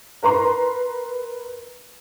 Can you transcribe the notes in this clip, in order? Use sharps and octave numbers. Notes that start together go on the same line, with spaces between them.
A#4 B4 A#5 C6